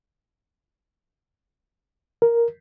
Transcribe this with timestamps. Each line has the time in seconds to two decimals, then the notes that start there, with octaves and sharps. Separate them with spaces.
2.22 A#4